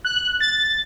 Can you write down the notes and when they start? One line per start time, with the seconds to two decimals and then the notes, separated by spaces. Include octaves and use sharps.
0.05 F#6
0.40 A6